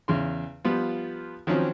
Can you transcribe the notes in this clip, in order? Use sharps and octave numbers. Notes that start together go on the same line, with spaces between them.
E2 C#3 C6
F3 G3 B3 F4
D#3 F3 F#3 C4 C#4